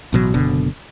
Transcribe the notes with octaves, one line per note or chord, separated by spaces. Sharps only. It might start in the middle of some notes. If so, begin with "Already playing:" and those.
A1 B2 F#3
F#1 B2 D3